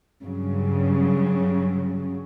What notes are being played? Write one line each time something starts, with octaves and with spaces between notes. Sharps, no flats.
G2 C#3 F#3